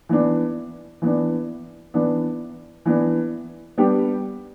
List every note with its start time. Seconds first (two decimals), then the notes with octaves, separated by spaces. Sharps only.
0.09 E3 B3 D4
1.02 E3 B3 D4
1.94 E3 B3 D4
2.86 E3 B3 D4
3.78 G3 B3 D4 G4